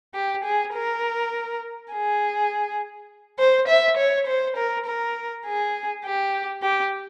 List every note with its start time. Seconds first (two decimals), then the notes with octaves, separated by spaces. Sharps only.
0.15 G4
0.45 G#4
0.74 A#4
1.92 G#4
3.39 C5
3.68 E5
3.97 C#5
4.27 C5
4.57 A#4
4.86 A#4
5.46 G#4
6.04 G4
6.62 G4